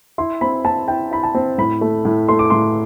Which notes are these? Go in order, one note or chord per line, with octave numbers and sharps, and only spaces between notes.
E4 C6
C4 B5
C4 A5
E4 G5
E4 B5
A5
C4
A2 B5
A3
A2
A3 C6
D6
A2 C6